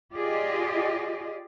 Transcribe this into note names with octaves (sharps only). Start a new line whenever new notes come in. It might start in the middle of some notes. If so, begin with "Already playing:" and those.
F4 G4 G#4 D5 D#5